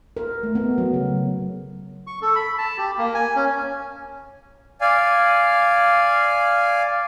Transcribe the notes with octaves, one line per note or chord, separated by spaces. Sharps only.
A#4
A3
B3
F#3
C#3
C#6
A4
B5
A5
G4
A#3
G#5
C#4
D5 F5 G#5